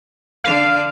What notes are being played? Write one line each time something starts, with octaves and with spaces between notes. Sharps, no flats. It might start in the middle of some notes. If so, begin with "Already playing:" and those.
D3 D4 F5